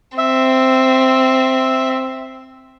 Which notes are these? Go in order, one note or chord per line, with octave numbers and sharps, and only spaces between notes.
C4 E5